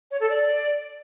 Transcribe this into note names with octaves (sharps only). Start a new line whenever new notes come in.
C#5
A4
D5